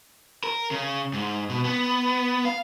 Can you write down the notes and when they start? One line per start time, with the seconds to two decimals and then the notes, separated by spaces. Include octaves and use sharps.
0.44 A#4
0.71 C#3
1.13 G#2
1.50 B2
1.65 B3
2.45 F5